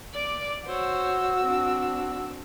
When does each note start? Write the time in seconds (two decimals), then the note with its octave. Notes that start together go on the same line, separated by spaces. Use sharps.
0.13 D5 D6
0.67 F#4 C5 C#5 E6
1.43 C4 D4